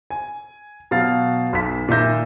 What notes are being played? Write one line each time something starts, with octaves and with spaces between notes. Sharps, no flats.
G#5
B2 F#3 F5 A6
B1 B6
A#2 D#3 E5 G6 A#6